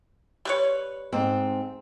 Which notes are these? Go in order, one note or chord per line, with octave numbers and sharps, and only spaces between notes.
G3 B4 C#5
G#2 C4